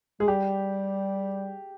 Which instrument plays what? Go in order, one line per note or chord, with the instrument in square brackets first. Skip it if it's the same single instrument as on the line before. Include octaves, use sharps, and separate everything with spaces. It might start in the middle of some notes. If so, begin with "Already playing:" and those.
[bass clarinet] G#3 [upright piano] G#4
[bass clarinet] G3 [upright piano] G4